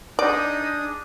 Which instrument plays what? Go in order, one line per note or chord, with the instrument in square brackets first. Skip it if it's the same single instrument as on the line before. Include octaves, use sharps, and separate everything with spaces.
[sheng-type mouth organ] D4 G#4 D#6 [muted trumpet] D#4 [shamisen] D5